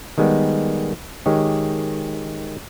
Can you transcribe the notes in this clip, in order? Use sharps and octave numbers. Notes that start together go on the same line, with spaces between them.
D#3 G3 G#3 B3
D#3 G#3 G4 C#5